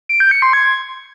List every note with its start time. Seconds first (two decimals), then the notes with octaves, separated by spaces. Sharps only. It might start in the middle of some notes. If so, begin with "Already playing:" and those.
0.09 D7
0.20 G6
0.31 C#7
0.42 C6
0.53 G#6